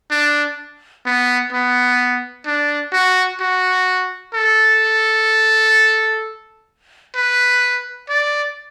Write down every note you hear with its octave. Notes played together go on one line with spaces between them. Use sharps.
D4
B3
B3
D4
F#4
F#4
A4
B4
D5